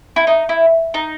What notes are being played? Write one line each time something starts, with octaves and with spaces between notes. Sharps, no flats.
E4
D#4
E4
D#4